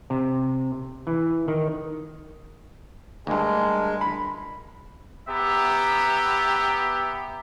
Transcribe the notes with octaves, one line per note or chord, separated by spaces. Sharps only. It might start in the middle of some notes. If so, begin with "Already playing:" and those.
C3
E3
D#3
D2 G2 G#3 D4 A#4 G#5
B5
B3 G4 E5 A#5